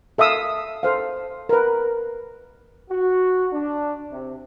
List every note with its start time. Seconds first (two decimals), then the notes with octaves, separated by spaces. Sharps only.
0.18 A4 E5 F5 D#6 E6
0.83 A4 C5 F5
1.49 A#4 B4
2.90 F#4
3.53 D4
4.11 C3